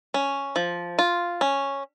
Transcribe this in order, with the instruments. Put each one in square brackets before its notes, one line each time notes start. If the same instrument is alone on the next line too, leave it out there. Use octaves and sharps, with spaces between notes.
[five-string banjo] C#4
F3
F4
C#4